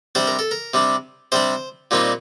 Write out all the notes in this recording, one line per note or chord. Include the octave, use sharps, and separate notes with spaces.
C3 G3 D4 C5
A#4
A4
A#4
C3 G3 D4
C3 G3 D4 C5
A#2 G3 C4 D#4